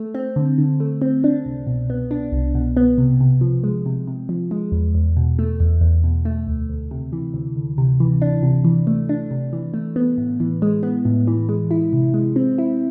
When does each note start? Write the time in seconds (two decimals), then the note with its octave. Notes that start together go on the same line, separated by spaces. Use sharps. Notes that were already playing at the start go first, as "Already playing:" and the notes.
Already playing: A3
0.15 C4
0.36 D3
0.58 D3
0.80 A3
1.02 C4
1.24 D4
1.45 C2
1.67 B2
1.90 B3
2.11 D4
2.32 C2
2.55 B2
2.77 B3
2.98 C3
3.21 C3
3.41 F3
3.64 G#3
3.86 C3
4.07 C3
4.29 F3
4.51 G#3
4.72 E2
4.95 E2
5.17 B2
5.39 A3
5.60 E2
5.81 E2
6.04 B2
6.25 A3
6.47 D2
6.69 D2
6.91 C3
7.12 E3
7.34 D2
7.56 D2
7.78 C3
8.00 E3
8.22 D4
8.43 C3
8.65 E3
8.87 A3
9.09 D4
9.31 C3
9.53 E3
9.74 A3
9.96 B3
10.18 A2
10.40 E3
10.62 G#3
10.83 B3
11.05 A2
11.27 E3
11.49 G#3
11.71 E4
11.93 C3
12.14 G#3
12.36 C4
12.58 E4